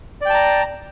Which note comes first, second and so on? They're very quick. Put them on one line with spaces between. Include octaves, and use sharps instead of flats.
D5 G5 A5 A#5